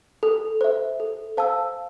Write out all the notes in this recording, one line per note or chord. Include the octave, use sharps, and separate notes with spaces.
A4
C5 E5
A4
C5 F5 A5 E6